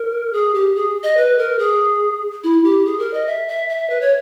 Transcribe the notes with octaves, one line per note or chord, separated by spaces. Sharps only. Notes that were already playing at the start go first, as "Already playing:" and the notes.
Already playing: A#4
G#4
G4
G#4
D#5
B4
A#4
G#4
E4
G4
G#4
A#4
D#5
E5
E5
E5
B4
C#5